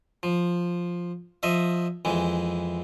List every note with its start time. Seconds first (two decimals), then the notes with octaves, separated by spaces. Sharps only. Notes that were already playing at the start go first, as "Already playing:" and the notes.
0.23 F3
1.43 F3 D#5 E5
2.05 F2 E3 G#3